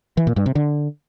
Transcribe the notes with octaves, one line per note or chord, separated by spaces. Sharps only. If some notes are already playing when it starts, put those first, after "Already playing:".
E3
A#2
G2
C3
D3